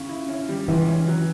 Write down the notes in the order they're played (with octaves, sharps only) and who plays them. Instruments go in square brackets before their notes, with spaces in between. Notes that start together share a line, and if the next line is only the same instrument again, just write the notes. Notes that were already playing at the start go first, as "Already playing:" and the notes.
Already playing: [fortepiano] C#3
E4
C#4
G3
[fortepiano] C#2 [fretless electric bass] E3
[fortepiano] C#4
F#3